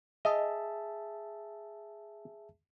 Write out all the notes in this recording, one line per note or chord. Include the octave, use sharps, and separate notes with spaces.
G#4 D#5 E5 A5